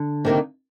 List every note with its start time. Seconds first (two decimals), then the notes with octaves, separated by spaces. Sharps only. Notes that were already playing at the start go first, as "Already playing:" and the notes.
Already playing: D3
0.25 C3 D#3 A#3 D#4